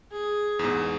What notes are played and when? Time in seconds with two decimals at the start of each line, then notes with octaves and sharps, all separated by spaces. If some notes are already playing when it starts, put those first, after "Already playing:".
0.12 G#4
0.59 E2 G#2